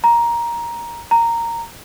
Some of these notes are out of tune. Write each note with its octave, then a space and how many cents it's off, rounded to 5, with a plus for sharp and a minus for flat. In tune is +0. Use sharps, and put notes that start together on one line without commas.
A#5 +10
A#5 -10